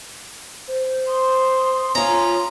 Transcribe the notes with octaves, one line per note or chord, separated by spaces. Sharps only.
C5
C6 D#6
C#4 F4 A#5